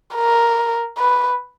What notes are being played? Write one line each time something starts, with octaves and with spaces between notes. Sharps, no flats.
A#4
B4